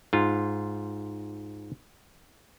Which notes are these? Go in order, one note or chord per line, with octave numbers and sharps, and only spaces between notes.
G#2 F4